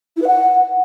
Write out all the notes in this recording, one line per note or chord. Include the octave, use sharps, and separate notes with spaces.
E4
B4
F#5